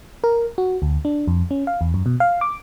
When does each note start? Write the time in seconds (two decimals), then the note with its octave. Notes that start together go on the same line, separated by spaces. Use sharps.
0.24 A#4
0.58 F#4
0.82 D2
1.05 D4
1.28 F2
1.51 C#4
1.67 F5
1.81 E2
1.94 F#2
2.06 B2
2.20 F5
2.41 D6